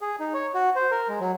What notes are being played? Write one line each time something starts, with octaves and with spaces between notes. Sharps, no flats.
G#4
D#4
C#5
F#4
C5
A#4
G#3
F#3